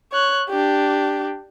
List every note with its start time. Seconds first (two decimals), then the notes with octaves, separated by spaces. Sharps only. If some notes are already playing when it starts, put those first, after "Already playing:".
0.13 C#5 F#6
0.50 D4 G4